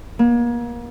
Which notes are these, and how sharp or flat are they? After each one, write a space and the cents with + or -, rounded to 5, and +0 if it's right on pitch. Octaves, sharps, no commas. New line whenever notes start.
A#3 +35